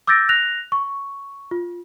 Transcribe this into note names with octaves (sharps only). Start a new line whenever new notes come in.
D6 E6 G6 A6 A#6 D7
F#6 A#6 F7
C#6
F4